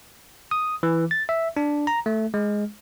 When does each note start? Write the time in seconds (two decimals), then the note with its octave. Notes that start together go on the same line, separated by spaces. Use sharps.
0.51 D#6
0.83 E3
1.11 A6
1.29 E5
1.57 D4
1.87 A#5
2.06 A3
2.34 G#3